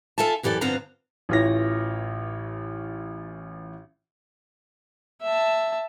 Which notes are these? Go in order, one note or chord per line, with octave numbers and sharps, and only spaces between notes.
F4 A4 E5 G#5 A5
F#2 E3 G4 A4 D5
G2 D3 F3 B3 C4 A#5
A1 E3 F4 C#5 A#6
E5 A5